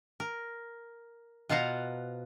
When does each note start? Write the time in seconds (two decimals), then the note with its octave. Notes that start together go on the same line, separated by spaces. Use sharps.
0.20 A#4
1.49 B2 F4 C5 F5 F#5 A#5